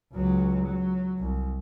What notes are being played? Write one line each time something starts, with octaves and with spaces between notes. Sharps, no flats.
C#2 F#3
F#3
C2